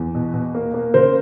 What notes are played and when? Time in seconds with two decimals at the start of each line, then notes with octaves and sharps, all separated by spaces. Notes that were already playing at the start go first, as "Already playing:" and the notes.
Already playing: E2
0.15 B2
0.34 B2
0.55 A#3
0.74 A#3
0.94 C#3 A#4 C5